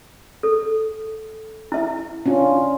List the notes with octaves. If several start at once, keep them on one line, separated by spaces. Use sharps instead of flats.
A4
E4 E5
C#4 D4 F4